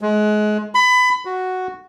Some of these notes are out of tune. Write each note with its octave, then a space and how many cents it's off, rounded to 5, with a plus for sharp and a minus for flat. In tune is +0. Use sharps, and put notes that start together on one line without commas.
G#3 +30
B5 +25
F#4 +0